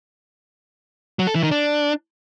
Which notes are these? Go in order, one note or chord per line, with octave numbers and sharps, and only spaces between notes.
F#3
A4
E3
D#3
D4